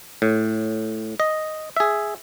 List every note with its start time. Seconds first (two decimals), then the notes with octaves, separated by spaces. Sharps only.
0.22 A2
1.20 D#5
1.77 G#4 E5